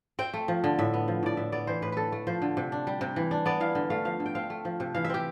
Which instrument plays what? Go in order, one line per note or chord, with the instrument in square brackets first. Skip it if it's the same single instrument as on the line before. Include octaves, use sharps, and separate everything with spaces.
[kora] C4 G5
A3
F3
D3
A2 E5
B3
F3
A2 D5
A2 E5
B3 D5
E3 C5
A2 B4
D3 A4 B4
A3
F3 C5
D3
C3
D4
G3
C3
E3
D4
B3 D5
E3 F5
D3
A3 F5
F3 F5
D3
G5
C4 F5
A3
F3
C3
E3 F5
E5
C4 G4